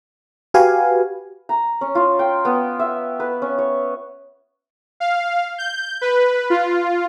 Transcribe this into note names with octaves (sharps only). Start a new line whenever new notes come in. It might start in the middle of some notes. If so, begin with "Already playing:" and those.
F#4 G4 B4 F5 G#5
A#5
C#4
F4
G5
B3
E5
B4
C#4
C#5
F5
G6
B4
F4